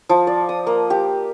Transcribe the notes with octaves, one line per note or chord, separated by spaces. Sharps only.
F3
D5
D#6
A#3
G4